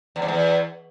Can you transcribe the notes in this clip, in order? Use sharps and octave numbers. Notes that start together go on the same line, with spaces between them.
E2
G#2
E2